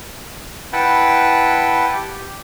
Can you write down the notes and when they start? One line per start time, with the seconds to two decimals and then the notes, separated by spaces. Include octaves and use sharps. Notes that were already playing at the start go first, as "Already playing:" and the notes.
0.73 E4 B4 F#5 G5 A5
1.93 G4